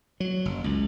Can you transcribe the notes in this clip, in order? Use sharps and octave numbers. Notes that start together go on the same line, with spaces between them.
F#3
F#1
C#2